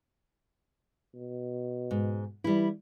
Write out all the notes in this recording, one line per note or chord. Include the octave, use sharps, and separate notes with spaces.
B2
G#2
E3 G3 E4